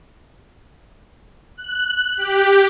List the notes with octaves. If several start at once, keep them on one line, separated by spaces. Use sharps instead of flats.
F#6
G4